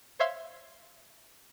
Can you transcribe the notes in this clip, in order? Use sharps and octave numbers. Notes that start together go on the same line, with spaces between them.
C5 C#5 E5 F5 C6